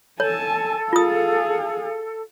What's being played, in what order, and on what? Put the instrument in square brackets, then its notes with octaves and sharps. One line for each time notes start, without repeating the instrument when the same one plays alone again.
[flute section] A4 [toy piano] C#5 [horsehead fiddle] G#5 A5
[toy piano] F4 D#6 [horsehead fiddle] G#4 F5